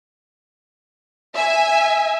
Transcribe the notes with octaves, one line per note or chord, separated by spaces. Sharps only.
E5 G#5